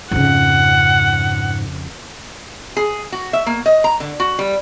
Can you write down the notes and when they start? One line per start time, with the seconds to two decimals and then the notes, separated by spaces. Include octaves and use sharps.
0.11 F2 G#2 C#3 F#5
2.77 G#4
3.12 F#4
3.33 E5
3.46 A#3
3.66 D#5
3.84 A#5
4.00 D3
4.20 F#4
4.39 G3